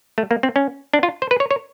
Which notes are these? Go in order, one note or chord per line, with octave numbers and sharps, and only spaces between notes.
A3
A#3
C4
C#4
D4
F4
C5
B4
C#5
C#5